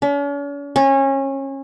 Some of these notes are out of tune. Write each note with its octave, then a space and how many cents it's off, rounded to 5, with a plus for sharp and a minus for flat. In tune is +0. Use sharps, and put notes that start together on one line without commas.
C#4 +45
C#4 -25